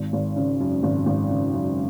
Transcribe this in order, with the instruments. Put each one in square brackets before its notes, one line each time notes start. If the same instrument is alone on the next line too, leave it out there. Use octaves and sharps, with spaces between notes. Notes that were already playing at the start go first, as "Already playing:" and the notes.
Already playing: [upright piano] G#1
G#1
C#3
F#2
G#1
G#1
C#3
F#2